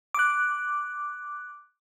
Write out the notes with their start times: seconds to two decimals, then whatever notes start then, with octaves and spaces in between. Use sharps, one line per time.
0.14 D6 F#6